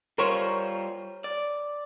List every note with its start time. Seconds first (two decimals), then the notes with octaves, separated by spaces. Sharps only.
0.18 G3 F4 A#4 C5 C#5
1.24 D5